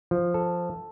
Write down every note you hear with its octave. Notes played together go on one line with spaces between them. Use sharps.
F3
A4